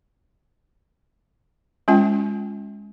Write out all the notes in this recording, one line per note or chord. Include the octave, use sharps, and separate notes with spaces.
G#3 C#4 F4 G5